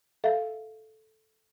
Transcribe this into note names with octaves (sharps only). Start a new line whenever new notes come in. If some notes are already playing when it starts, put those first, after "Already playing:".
A4 E5 F5